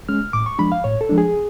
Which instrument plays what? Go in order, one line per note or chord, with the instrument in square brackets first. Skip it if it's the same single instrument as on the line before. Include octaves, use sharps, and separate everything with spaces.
[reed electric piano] G#3 C#4 F6
A2 D6
C#6
F3 G#3 D4 B5
F5
A2 C#5
A4
F3 G#3 D4
G#4